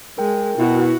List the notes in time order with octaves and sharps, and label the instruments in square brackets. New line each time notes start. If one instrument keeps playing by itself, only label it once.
[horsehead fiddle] G#3 [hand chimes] A#4 G5
[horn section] B2 [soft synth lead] E4 [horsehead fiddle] F#4